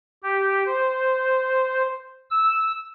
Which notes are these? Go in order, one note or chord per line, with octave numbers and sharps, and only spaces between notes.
G4
C5
E6